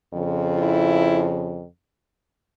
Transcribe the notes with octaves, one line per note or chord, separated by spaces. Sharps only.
F2 C#3 F3
E4